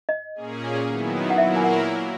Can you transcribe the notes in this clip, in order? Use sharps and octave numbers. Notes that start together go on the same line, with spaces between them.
D#5
A#2 A#3 C#4 G#4
D#3 F#3 B3 E4
F#5
A#2 F#3 A#3 E4 A#4 E5
G#5
F#5